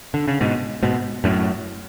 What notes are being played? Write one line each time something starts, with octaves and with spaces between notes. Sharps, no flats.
D3
C#3
G#2 B2
G#2 B2
F#2 A2